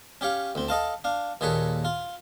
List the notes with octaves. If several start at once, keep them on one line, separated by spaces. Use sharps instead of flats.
C#4 G4 C#5 F5
D2 C4
A4 D#5 F5 A5
D4 F5
D#2 A#2 G#4 A4 B4 C#5
F4